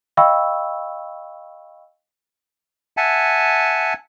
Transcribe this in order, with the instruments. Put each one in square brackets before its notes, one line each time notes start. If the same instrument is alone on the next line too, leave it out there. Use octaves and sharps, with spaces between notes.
[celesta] D#5 F5 G5 B5 C#6 E6
[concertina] E5 F#5 G#5 A5